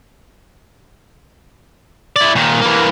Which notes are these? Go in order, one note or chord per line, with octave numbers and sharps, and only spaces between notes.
E4 D5
A#2 D#3
E3 A#3